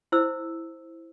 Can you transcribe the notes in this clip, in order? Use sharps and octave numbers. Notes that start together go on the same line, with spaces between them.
E4 C5 E6